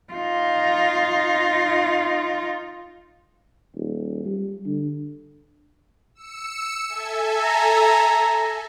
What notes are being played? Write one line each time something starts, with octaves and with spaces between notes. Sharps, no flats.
D#4 F4
D#1
G3
D3
E6 C#7
A4 E5 G#5
A#5